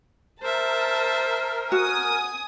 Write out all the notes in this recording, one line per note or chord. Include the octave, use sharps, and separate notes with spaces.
A#4 C5 E5 A5
F#4 G#5 D#6